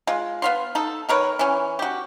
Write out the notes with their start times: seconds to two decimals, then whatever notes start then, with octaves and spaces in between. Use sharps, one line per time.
0.07 G#3 F4
0.42 B3 F5 C6
0.75 D#4 A4
1.09 D#3 A#4 B4 C#5
1.39 E3 C#4
1.79 F#4 G4